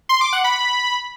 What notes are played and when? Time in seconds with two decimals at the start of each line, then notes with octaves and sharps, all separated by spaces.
0.09 C6
0.21 D6
0.33 F#5
0.44 B5